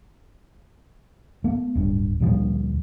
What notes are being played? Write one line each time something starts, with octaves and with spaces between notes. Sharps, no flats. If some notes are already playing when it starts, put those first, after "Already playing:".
A3 B3
D1 G2
D2 A#2 F3 G3